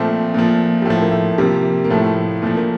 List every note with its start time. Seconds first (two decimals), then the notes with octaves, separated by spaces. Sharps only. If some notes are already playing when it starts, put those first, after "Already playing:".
Already playing: A#2 F3 A3 C4
0.34 A#2 F3
0.82 G3
0.85 A2 F3 A3
1.01 A#3
1.12 A3
1.38 C3 F3 G3 A#3
1.84 A#3
1.90 A2 F3 A3
2.42 A#2 F3 A3
2.56 A#3